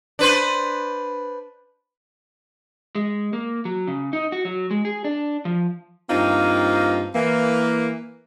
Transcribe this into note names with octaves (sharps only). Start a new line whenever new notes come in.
D4 B4 C5
G#3
A#3
F#3
C#3
D#4
F#4
F#3
G#3
G#4
D4
F3
G2 A#3 C4 D#4 F4
E3 A#3